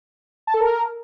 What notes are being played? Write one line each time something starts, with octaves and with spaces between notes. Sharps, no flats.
A5
A4
A#4